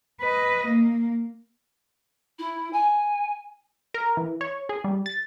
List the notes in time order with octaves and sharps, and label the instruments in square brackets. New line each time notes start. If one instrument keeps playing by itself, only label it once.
[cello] B4 D#5
A#3
[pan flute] E4
G#5
[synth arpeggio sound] A#4
E3
C#5
G#4
G3
A6